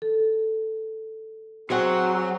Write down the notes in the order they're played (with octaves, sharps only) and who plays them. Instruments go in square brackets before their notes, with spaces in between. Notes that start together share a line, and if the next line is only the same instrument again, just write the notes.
[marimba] A4
[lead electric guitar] F#3 [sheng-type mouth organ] C4 F#4 C6 [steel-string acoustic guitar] G#4 C5 F#5